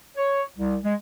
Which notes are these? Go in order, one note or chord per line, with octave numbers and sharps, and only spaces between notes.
C#5
C2
G#3